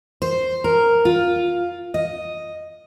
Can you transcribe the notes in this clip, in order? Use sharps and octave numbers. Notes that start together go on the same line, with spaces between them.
C5
A#4
F4
D#5